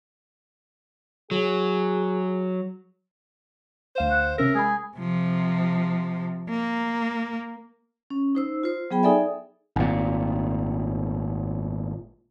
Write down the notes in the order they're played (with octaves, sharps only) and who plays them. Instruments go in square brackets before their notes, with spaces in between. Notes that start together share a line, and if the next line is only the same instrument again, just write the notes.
[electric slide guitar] F#3 [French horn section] G#4
[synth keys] D2 F5 E7 [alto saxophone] C5
[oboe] F#5
[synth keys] C3 C#4 A#6 [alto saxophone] A#4 [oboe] E5
[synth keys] G#3 B5 [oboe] G#4
[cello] C3 F3
A#3
[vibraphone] C#4
D#4 C5 E6
F4 C5
F#3 B3 G#4 G5 B5
D#4 G#4 A4 D5 E5 G#5
[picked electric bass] G#1 A#2